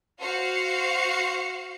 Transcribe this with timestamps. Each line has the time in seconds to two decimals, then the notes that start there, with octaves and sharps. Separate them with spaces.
0.19 F#4 C5 F5 F#5 C#7